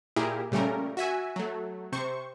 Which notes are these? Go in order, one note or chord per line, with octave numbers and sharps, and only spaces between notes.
A#2 E4 G4 G#4 A#4
A#2 C#3 G3 A3 C#4 A#4
F#4 E5 G#5
F#3 A3
C3 C5 C#6